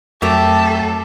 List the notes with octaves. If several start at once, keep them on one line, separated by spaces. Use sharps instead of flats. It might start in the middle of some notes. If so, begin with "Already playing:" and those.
F2 F#3 A3 G4 A4 A#4 E5